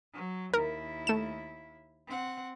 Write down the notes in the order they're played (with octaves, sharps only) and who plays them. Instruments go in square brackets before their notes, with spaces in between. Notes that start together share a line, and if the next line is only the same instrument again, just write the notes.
[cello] F#3
[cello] D#2 E4 [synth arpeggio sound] A#4
[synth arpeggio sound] A3 E7
[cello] C4 F#5